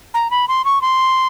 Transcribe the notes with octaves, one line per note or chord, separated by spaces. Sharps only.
A#5
B5
C6
C#6
C6